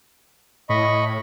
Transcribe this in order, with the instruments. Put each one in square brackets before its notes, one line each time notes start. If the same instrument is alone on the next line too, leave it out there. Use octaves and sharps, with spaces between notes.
[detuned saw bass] A2 [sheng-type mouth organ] D#5 B5 C#6